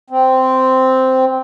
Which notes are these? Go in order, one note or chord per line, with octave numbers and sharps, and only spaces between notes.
C4